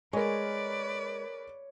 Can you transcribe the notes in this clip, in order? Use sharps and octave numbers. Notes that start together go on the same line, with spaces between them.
G#3 G#4 A#4 B4 C#5 D5